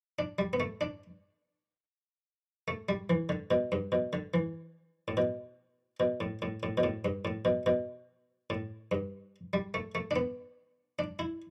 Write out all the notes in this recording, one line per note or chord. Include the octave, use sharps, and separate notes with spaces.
D4
G3
B3
A3
D4
A3
G3
E3
D3
B2
G2
B2
D3
E3
A2
B2
B2
A2
A2
A2
B2
A2
G2
A2
B2
B2
A2
G2
G3
A3
A3
D4
B3
D4
E4